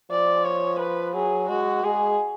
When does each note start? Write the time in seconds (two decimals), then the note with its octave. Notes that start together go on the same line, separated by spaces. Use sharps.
0.11 F3 D5
0.45 C#5
0.79 B4
1.14 F#3 G#4
1.49 G#3 F#4
1.83 G#3 G#4